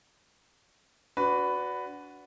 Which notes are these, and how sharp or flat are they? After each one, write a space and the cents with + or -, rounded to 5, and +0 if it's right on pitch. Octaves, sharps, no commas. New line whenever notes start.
D4 -20 F#4 +0 B4 +10